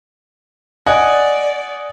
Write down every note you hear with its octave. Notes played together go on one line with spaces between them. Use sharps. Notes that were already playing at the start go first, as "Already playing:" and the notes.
D5 D#5 F#5 G#5